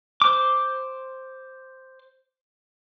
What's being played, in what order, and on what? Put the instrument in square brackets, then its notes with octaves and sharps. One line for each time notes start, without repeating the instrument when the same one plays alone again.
[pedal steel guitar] C5 D6